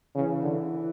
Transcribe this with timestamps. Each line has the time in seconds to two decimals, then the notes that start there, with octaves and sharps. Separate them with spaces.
0.14 C#3 E3
0.42 D3